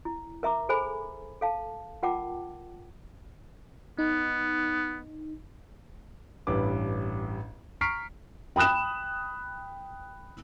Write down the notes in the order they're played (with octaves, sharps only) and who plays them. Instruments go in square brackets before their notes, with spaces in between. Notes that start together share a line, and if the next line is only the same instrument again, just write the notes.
[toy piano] E4
A#4 E5 A#5 D6
G#4 A4 C5 G#5 B5
A4 F5 A5
F4 A#4 F#5 G5 A5 D6
[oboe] B3 [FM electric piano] D#4
[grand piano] A1 G2 B4 D6
A#5 C#6 F6 B6 C7 D7
[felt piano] G5 B5 D#6 F#6 E7